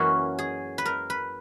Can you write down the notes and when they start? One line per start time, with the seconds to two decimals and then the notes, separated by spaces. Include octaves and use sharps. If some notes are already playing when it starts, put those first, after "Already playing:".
Already playing: F#2 E3 A#3 C#4 F#4
0.39 G#4
0.78 B4
0.86 A#4
1.10 B4